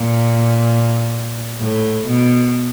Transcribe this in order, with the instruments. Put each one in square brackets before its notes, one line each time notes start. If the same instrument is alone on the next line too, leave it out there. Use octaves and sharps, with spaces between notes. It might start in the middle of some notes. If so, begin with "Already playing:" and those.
Already playing: [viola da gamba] A#2
A2
B2